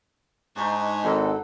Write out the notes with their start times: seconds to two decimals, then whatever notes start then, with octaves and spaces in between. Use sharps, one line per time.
0.56 G#2 D4 D#4 C#6
1.03 G#1 A4 F#5